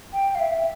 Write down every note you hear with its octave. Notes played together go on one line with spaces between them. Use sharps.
G5
F5
E5